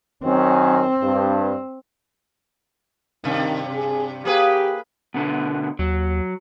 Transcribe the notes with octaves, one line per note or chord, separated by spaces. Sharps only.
F#2 D#3 C4 C#4
G2
G2 C3 D#3
G#4
A#3 G4 G#4 B4
B2 D3 B3
D#2 F#3